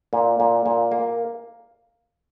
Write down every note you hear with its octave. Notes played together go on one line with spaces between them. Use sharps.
A#2
A#2
A#2
A#3